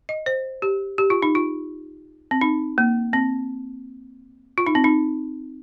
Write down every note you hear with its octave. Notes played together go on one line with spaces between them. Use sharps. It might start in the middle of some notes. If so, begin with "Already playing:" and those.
D#5
C5
G4
G4
F4
D#4
F4
C4
D#4
A#3
C4
F4
D#4
C4
D#4